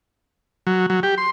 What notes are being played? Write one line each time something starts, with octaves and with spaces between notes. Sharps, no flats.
F#3
F#3
G4
C6